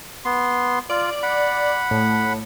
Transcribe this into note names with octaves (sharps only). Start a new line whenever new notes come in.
B3 C6
F4 D5
F#5 B5
A2